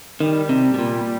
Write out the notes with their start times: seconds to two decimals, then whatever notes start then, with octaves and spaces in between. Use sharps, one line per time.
0.20 D#3 G3
0.49 C3
0.74 B2
0.79 A#2